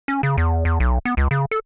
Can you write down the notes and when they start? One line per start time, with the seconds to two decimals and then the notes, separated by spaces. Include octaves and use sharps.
0.08 C#4
0.23 C#3
0.37 E2
0.65 E2
0.80 B1
1.05 B3
1.17 C#2
1.31 C#3
1.51 A4